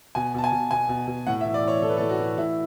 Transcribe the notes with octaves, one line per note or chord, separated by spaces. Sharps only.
B2 G#5
B2 A5
G#5
B2
B2 G#5
B2
B2
A2 F#5
E5
E3
D5
E3 C#5
A2 A4
B4
A4
A2
F#4
E3
A2 E4